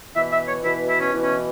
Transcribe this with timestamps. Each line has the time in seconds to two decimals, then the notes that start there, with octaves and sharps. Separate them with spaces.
0.16 B2 E3 E5
0.32 E5
0.47 C#5
0.64 B2 E3 E4
0.89 E4
1.00 C#4
1.12 B2 E3
1.23 C#4